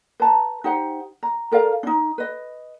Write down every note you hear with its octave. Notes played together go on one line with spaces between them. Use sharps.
B4 A5 A#5
D#4 G4 C5 F#5
A#5
A4 A#4 D5 F5
D4 D#4
B4 D#5